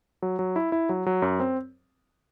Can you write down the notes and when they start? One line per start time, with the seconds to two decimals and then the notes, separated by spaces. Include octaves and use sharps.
0.22 F#3
0.39 F#3
0.56 E4
0.72 E4
0.89 F#3
1.06 F#3
1.22 F#2
1.40 C4